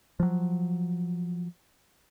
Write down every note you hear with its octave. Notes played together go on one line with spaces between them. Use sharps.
F3 F#3